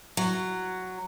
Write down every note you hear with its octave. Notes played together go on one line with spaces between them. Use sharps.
F#3